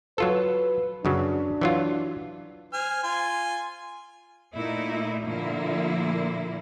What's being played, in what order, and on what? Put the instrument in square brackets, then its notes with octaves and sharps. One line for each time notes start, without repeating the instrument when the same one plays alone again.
[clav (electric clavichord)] F#3 F4 A4 [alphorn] B4
[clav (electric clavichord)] F#2 C#3 F#3 [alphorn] D4
[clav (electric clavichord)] E3 F#3 F4
[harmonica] C5 G#5 F6
F4 G#5 C6
[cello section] A#2 A3 D#4 E4
A#2 D3 F3 A#3 E4